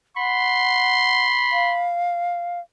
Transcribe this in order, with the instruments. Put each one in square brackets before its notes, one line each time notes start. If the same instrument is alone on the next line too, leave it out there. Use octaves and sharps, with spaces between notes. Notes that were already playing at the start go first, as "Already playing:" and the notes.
[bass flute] F#5 [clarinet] B5 [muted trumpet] C6
[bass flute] F5